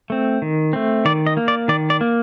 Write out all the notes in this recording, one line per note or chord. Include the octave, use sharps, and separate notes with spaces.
A3 C4
D#3
A3 C4
D#3 D5
D#5
A#3
D5
D#3 D5
D5
A#3